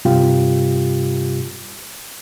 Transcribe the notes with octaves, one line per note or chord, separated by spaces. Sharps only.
G2 C3 G3 F4 G4